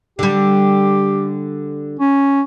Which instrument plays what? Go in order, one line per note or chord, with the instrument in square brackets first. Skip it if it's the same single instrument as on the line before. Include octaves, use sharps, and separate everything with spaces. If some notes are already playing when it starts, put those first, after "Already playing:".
[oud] D3 G3 [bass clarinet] G4
[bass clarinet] C#4